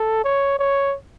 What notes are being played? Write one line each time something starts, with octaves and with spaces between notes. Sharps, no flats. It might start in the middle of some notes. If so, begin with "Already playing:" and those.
Already playing: A4
C#5
C#5